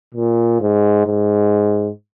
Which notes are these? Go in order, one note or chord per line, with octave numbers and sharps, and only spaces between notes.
A#2
G#2
G#2